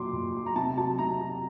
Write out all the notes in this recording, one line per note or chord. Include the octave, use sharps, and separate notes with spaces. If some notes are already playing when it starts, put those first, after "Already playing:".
Already playing: A#2 F#3 C6 D6
A#2
F#3
A#5
C3 A5
F#3 A5
C3 A#5
F#3